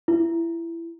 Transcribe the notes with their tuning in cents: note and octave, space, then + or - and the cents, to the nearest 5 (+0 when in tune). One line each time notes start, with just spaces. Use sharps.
E4 +20